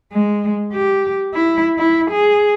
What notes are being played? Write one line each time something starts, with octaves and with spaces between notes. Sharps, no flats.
G#3
G4
E4
E4
G#4